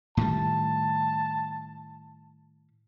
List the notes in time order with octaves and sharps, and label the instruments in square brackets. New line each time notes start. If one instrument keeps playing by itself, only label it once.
[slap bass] A2 D#3 G3 [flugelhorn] A5